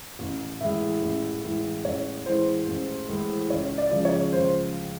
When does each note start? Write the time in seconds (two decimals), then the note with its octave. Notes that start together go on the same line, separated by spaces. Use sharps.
0.19 A1
0.61 A2 E3 G#3 E5
1.01 A1
1.44 A2 E3 G#3
1.84 A1 C#5
2.26 A2 E3 G#3 C5
2.67 A1
3.08 A2 E3 G#3
3.50 C#2 C#5
3.78 D5
3.91 C#3 F3 G#3
4.05 C#5
4.33 C#2 C5